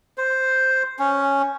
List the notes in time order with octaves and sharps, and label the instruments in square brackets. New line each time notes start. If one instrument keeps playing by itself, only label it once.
[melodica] C5
C#4